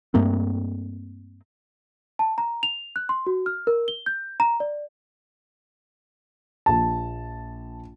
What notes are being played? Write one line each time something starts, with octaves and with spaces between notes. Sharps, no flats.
G2 A3 A#3 C4
A5
A#5
F7
F#6
C6
F#4
F6
A#4
G7
G6
A#5
D5
A#1 A5